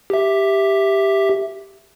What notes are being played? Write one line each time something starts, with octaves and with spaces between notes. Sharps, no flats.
G4 E5